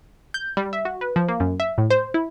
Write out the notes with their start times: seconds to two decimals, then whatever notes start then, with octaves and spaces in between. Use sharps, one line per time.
0.34 G6
0.57 G3
0.73 E5
0.85 F#4
1.01 B4
1.16 F3
1.29 A#3
1.40 F#2
1.60 E5
1.78 A2
1.90 C5
2.14 E4